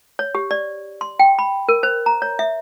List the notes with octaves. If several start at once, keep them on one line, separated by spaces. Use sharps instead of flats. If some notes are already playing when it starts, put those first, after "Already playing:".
C#5
G4
D5
C6
G5
B5
A#4
C5
A#5
C#5
E5